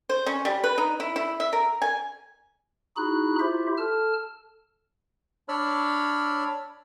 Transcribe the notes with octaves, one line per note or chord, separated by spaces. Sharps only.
C5
C#4
G3
B4
D#4
E4
E4
E5
A#4
G#5
D#4 E4 F#4 G#4 B5 F#6
E4 F4 G4 C5 E5
A4 A5 F6
D4 C#5 D5 B5 E6 F6